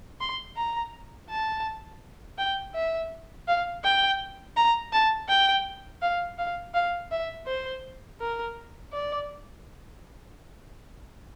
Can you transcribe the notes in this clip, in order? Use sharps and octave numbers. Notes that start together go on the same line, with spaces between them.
C6
A#5
A5
G5
E5
F5
G5
A#5
A5
G5
F5
F5
F5
E5
C5
A#4
D5